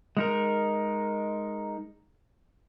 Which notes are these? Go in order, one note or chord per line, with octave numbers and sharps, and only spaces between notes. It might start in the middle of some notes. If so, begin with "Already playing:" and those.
G#3 D#4 A#4